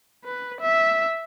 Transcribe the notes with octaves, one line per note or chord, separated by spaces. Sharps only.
B4
E5